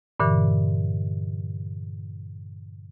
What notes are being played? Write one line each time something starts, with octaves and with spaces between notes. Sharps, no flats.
G2 A#2 D3 E3